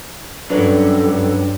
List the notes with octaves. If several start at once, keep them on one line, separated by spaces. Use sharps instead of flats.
G2 F#3 G3 C#4 D4 A4 B4 D5